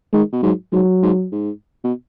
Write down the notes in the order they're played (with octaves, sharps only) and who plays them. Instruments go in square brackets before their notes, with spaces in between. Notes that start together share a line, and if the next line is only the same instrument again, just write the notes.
[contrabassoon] D#3 [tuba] G#3
[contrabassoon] B2
[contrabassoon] G#2 [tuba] F#3
[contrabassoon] G#2 [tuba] F#3
[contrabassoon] G#2
G#2
B2